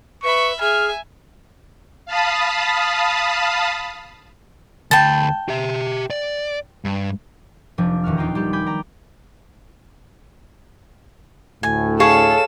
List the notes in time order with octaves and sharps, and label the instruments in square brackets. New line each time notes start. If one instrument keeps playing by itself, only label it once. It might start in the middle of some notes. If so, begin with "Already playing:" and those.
[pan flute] B4 [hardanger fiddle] E5 B5 [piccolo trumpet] C#6
[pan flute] G#4 [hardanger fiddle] E5 G#5 [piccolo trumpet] F6
[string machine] F5 A5 B5 D#6
[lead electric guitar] D2 B5 [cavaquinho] G5 A5
[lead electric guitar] G4 E5
D5
G2
[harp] F1 F3 D4
D#1 E2 F#4 F6
B3 D#4 F4 G5 A#5
G3 G4 B5
G#5 B5 D6 G6
D5 G5 A#5
[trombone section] D2 A2 [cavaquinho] G#5
[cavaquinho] G#4 C#5 F5 [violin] A4 E7